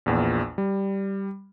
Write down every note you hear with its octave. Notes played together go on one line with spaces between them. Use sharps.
A#1 E2 A#2
G3